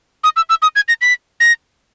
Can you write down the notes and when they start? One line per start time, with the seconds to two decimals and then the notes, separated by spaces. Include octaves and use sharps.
0.24 D#6
0.36 E6
0.49 E6
0.62 D#6
0.76 G#6
0.88 A#6
1.01 B6
1.40 A#6